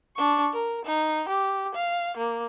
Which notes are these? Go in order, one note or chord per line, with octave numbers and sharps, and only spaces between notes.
D4 C#6
A#4
D#4
G4
F5
A#3